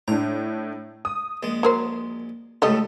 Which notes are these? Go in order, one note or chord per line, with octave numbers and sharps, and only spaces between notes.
A2 D4 A#5
D#6
A#1 G#3
F#3 A#4 C5
C#2 A2 G3 G4 A4 D#5